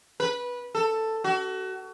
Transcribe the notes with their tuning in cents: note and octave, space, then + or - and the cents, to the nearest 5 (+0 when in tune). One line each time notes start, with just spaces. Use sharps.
B4 -15
A4 +10
F#4 +30